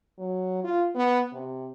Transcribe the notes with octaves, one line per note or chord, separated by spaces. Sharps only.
F#3
F4
B3
C3